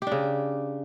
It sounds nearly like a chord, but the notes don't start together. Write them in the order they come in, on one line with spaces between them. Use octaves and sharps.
G4 D4 C#3